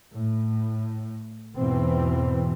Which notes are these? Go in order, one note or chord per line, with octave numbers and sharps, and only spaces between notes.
A2
E2 G#2 B2 E3 C4